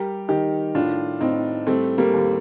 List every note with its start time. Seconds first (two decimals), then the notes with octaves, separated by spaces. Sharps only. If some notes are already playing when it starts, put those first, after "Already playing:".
Already playing: G3 G4 A#4
0.28 D#3 D#4 G4
0.75 A2 D4 F4
1.20 A2 C4 D#4
1.67 G3 A3 C4
1.98 G3 A#3
2.14 D#2